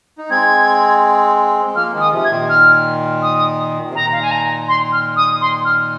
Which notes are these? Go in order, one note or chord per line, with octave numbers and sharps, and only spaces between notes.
D#4
G#3 C4 G#6
G#3
F3 A#3 F6
D#3 G#3
D#6
C3 F3
G#6
A#2 D#3
F6
D#6
C3
A#2 D#3 A#5
F5
G#5
A#5
C6
F6
D#6
C6
F6